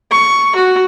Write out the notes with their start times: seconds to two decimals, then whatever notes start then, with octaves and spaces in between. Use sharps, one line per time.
0.12 C#6
0.56 F#4